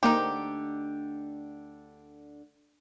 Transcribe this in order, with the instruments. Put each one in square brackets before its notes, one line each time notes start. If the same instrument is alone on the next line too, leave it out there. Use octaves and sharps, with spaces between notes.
[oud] D2 D3 [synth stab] A#3 C5 [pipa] D#4 G4